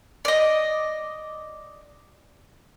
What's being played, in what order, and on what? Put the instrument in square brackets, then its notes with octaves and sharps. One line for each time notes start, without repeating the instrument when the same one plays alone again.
[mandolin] D5 D#5